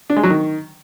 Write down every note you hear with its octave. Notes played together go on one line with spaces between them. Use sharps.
D4
G#3
F#3
D#3